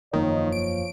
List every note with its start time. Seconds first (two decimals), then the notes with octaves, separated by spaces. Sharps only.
0.13 E1 F#2 D#3 F3 A#3 C#5
0.52 D7